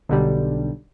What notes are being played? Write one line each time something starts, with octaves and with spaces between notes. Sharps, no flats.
B1 D3 G3